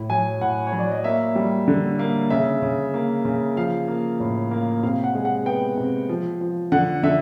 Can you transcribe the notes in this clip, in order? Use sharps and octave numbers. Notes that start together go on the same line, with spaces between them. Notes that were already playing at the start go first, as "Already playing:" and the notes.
Already playing: A2
F#3 G#5
A2 F#5
C#5
F#3
D5
D#5
A#3 E5
G3
D3
A#3
C#3 E5
C#3
A#3
C#3
F3 F5
A#3
A2
A#3
C3 F5
F#5
G#3
F#5
B3 G5
C3
F3
F3
D3 F#5
D3 E5